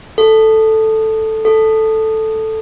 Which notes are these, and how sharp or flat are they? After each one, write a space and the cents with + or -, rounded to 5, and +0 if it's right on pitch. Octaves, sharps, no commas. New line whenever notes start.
A4 +0
A4 +0